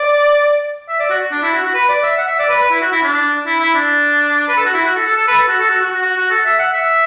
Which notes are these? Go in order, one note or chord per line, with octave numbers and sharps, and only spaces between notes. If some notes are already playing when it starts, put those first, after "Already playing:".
Already playing: D5
E5
D5
F#4
D4
E4
F#4
F#4
B4
D5
E5
F#5
E5
D5
B4
B4
E4
F#4
E4
D4
E4
E4
D4
B4
A4
F#4
E4
F#4
A4
A4
A4
B4
A4
F#4
A4
F#4
F#4
F#4
F#4
F#4
A4
E5
F#5
E5